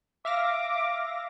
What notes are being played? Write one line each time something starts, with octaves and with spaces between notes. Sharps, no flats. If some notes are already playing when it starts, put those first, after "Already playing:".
E5 F5 D6 A#6